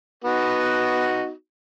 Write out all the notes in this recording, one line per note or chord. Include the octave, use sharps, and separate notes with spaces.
B3 D#4 F#4